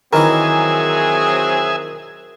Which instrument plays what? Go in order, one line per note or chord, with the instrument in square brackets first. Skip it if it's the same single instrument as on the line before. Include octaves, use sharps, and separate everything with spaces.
[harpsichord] D#3 E3 [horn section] F#3 C4 G#4 [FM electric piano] A#4 [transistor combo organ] E5 G#5